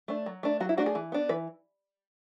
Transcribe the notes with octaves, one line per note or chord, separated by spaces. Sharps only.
A3 D4
F#3
A3 D4
F#3 F#4
E4
A3 D4 F#4
G#4
E3
B3 D4
E3 B4